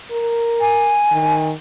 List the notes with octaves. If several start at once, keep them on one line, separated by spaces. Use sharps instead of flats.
A#4
G#5
D#3